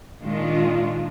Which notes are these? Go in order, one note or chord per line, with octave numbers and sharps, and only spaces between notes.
A#2 D#3 G#3 D4 F4